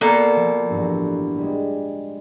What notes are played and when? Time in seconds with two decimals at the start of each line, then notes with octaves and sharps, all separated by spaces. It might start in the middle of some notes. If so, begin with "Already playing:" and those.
0.01 B2 A#3 A4 D5
0.36 F3
0.70 A1 G2
1.38 G3 G#3